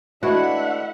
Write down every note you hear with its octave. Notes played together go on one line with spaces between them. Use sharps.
G#3 A3 D4 E4 F#4 B4 E5 F#5